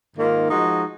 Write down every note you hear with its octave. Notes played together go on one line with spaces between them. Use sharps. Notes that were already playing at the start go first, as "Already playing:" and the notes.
G#2 D#3 A#3 F4
F3 G#3 D#4 F#4